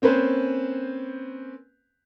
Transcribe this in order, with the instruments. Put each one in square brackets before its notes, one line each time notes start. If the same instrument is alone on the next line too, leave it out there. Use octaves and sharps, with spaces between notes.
[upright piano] A#3 C4 C#4 B4 C5